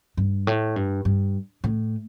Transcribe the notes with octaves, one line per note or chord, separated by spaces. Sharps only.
G2
A2
G2
G2
A2